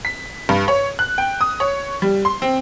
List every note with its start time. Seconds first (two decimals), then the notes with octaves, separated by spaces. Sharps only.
0.05 B6
0.49 G2
0.68 C#5
0.99 F#6
1.18 G5
1.41 D#6
1.60 C#5
2.02 G3
2.25 C6
2.42 C4